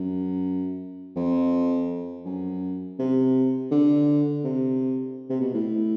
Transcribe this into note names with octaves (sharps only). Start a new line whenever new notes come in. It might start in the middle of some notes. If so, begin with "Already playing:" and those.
Already playing: F#2
F2
F#2
C3
D3
C3
C3
B2
A2